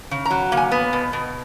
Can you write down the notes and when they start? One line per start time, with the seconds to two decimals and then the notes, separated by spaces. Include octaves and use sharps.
0.11 C#3
0.25 A#5
0.31 F#3
0.52 A#3
0.57 G#5
0.71 B3
0.93 B2
1.13 B2